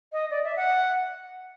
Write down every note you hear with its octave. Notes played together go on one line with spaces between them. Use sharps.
D#5
D5
E5
F#5